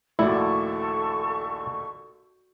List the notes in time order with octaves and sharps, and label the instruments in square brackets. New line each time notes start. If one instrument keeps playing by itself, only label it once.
[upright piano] A#1 D#2 A3 [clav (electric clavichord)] E4 [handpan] F#4 D5 [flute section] A4 C#6